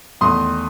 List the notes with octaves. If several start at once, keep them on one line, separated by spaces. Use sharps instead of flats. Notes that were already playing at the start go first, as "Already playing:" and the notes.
E2 D#3 A3 C6 D#6